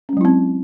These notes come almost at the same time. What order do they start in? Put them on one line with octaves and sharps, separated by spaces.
C#4 G#3 F#3 E4 C4